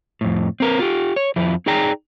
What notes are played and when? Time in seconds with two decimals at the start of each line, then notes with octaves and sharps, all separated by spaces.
0.21 F2 A2
0.60 C4 A#4 B4
0.79 F4 G4
1.16 C#5
1.36 F2 F3 E4
1.66 D#4 G#4 D5 G5 A#5